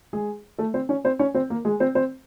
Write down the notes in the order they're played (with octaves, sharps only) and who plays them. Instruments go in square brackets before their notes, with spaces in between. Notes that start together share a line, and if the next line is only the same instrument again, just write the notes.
[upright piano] G#3 G#4
A3 A4
C4 C5
C#4 C#5
C4 C5
C#4 C#5
C4 C5
A#3 A#4
G#3 G#4
C4 C5
C4 C5